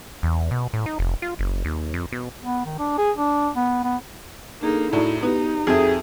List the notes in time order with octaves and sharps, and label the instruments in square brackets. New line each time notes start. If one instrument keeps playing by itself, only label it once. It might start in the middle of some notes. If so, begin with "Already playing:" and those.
[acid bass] E2
B2
A2
D#4
F1
F4
F#1
D#2
F2
B2
[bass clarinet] B3
D#3
D4
G#4
D4
B3
B3
[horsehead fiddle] A#3 D#4 [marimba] D4 G#4 A4
[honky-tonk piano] A2 [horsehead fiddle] D#4 E4 [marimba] F#4 D5
[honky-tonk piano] B3 [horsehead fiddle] D#4 [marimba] G4 B4
[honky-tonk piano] F2 C4 [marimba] F#4 A4 E5 [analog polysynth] G#4